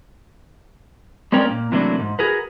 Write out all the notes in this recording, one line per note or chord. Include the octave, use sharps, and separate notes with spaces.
G#3 C4 C#4 A#4 D5 G5
A#2 A#3
C3 E3 F#3 A3 A#3 D4
G#2
F#4 G#4 A#4 B4